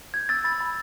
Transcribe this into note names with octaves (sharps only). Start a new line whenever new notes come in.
G6 G#6
E6 A6
B5 A6
B5